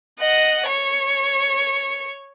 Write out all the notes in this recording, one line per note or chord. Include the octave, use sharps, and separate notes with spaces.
D#5 F#5
C#5 C#7